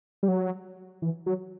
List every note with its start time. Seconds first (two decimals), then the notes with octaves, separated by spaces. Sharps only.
0.23 G3
0.28 F#3
1.02 E3
1.26 F#3